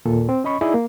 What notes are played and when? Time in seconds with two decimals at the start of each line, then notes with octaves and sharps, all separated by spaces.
0.05 D#2 A#2 A4
0.29 C4
0.44 C#4 D#5 B5 C#6
0.61 D#4 E4 G#4 D5 D#5
0.74 A#3